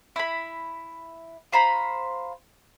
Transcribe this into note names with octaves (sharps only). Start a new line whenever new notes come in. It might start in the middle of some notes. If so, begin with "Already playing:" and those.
E4 B5
F4 C5 A#5 B5